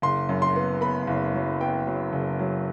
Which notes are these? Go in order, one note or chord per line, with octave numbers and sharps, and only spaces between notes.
F#1 C6
F#2
C6
B3
B3 B5
F#1
F#3
B3 G5
F#3
F#1
F#3